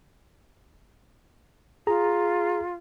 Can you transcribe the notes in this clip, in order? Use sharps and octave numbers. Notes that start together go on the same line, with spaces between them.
F4 G#4 A#5